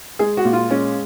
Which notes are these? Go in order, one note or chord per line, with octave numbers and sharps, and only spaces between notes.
G#3 G#4
F#4
A#2
F4
G#3 C#4